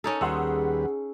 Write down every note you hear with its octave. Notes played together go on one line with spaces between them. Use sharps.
C#4 D#4 A4 A#4
D#2 G3 G#4 B4 F#5 C6 E6